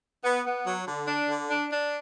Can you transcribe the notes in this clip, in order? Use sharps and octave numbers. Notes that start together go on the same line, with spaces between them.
B3
B3
F#3
D3
D4
D3
D4
D4